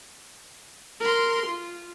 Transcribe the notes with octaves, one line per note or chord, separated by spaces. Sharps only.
A#4 C6
F4